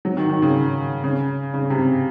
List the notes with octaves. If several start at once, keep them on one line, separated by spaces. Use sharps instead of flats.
F#3
D#3
D#3
C#3
C#3
C#3
C3